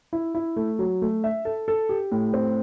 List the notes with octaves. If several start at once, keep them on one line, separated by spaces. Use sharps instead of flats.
E4
E4
A3
F#3
A3
E5
A4
A4
G4
A2
C4